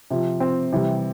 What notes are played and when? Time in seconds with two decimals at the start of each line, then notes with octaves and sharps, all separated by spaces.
0.11 C3 F3
0.40 C4
0.73 C3 E3 G3